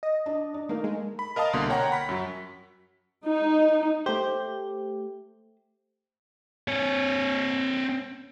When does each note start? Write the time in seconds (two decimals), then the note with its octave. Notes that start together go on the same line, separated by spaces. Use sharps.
0.03 D#5
0.26 D4
0.54 D4
0.69 A3 A#3 D#4 A#4
0.84 G#3
1.19 B5
1.36 A#4 D#5 F5 A5 D#6
1.53 C2 B2 D3 A#3 C6
1.69 A#4 C#5 F#5 G5 A#5
1.92 B5 B6
2.09 F#2 F#3
3.27 D#4
4.06 A3 G4 C5
6.68 C4 C#5